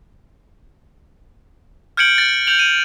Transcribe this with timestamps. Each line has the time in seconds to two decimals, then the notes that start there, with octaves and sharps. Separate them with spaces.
1.97 F6 G6 G#6 C#7 D7 F#7
2.18 A6
2.47 G6 F7 F#7
2.59 D#7